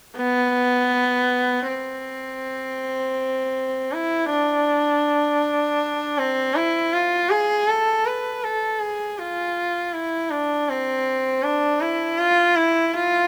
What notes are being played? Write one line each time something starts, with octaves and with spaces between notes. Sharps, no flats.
B3
C4
E4
D4
C4
E4
F4
G#4
A4
B4
A4
G#4
F4
E4
D4
C4
D4
E4
F4
E4
F4